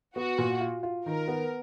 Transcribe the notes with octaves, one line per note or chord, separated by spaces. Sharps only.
B3 F#4
A#2
F4
F4
D#3 A#4
B3